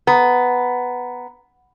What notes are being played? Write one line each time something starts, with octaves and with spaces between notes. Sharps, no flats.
B3 A#5